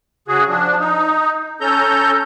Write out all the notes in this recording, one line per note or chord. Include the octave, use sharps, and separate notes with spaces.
C#3 F#4 G#4
F3 D4
D#4
C#4 A4 A#5 G6